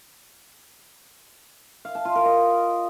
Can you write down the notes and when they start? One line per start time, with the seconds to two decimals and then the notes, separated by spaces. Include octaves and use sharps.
1.85 F5
1.95 A5
2.05 F4
2.15 A#4
2.26 D#5